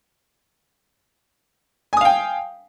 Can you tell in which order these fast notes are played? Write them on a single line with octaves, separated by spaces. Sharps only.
G#5 D#6 F5 G5